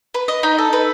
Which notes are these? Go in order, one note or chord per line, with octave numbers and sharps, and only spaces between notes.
B4
D#5
D#4
A4
B4